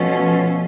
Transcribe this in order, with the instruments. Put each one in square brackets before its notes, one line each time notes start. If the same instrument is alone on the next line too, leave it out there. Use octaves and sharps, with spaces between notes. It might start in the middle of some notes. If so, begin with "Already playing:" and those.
Already playing: [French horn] B2 [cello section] F3 A3 C#4 F4